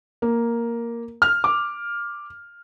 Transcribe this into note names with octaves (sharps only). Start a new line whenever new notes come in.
A#3
F6
D6